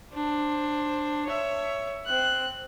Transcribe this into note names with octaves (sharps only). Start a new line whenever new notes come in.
D4 C5
C#5 E5
C4 F#6